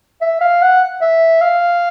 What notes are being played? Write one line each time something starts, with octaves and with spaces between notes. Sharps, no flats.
E5
F5
F#5
E5
F5